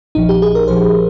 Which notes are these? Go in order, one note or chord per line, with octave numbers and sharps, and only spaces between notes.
A#1 A#2 F3 D#4
G4
G#4
A#4
A#1 A#2 F3 C5